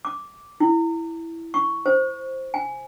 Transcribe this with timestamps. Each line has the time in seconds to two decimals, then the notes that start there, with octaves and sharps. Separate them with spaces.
0.05 D6
0.60 E4
1.54 C#6
1.86 C5
2.54 G#5